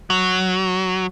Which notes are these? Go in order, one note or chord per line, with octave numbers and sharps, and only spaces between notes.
F#3